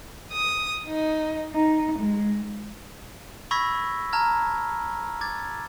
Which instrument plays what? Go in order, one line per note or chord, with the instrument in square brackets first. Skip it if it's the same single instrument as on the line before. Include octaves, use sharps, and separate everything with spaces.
[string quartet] D#6
D#4
D#4
G#3
[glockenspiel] B5 C#6 E6 G#6 A#6 B6
A5 A#5 F6 G#6
D6 G#6 A6